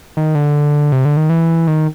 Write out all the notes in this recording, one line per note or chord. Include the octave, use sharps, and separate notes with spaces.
D#3
D3
C3
D3
D#3
E3
D#3